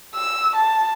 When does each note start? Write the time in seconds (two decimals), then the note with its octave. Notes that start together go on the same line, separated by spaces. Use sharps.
0.15 E6
0.56 A5